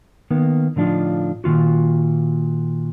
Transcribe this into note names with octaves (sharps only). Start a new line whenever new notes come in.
D#3 A#3 B3
A2 D3 F3 D4 D#4 F4
A#2 D#3 F4 F#4